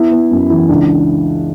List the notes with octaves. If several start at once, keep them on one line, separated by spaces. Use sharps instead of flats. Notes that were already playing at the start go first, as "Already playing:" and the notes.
Already playing: B3 E4
B3
F#2
E3
C#2 D4